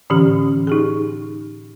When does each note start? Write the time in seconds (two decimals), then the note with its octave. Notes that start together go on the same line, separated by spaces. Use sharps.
0.10 A2 D3 E3 C#4 G4
0.67 D#4 G4 G#4